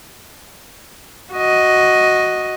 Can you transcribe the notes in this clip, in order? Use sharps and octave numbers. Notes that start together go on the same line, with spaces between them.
F#4 D#5